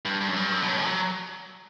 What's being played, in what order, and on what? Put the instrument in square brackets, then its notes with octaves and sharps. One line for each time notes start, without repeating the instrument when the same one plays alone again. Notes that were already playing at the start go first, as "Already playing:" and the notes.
[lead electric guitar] G2
G2
F#2
G2
F#2
B2
A2
F#3